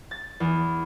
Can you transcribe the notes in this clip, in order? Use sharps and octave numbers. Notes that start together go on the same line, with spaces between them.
A6
E2